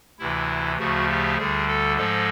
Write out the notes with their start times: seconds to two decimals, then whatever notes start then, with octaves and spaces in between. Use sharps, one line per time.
0.19 D2 C3 E3 E4
0.79 D2 C#3 F3 A3 F#4
1.09 G4
1.38 D2 D3 G3 G#4
1.68 A4
1.97 G#2 F3 G#3 A4